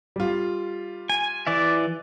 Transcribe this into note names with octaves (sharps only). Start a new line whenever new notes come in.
G3 F4
G#5
E3 D5 E5